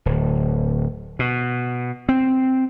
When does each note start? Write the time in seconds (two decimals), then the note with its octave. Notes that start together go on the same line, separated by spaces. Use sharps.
0.06 D1
1.19 B2
2.09 C4